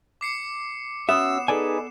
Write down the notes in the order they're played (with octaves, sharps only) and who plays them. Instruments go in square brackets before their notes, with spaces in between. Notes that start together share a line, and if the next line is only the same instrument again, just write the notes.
[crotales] D6 C7 C#7
[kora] B3 [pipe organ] C#4 F#4 E6 [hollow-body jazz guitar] E5 [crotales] E7
[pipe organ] D#4 G#4 B4 [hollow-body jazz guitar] A4 D5 G#5